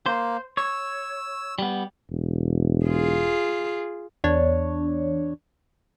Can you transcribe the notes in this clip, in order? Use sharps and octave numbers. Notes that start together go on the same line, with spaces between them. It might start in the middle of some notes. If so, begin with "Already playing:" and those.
A#3 C5
C#5 E6
G3 B3
E1
F4 G#4
E2 D4 C#5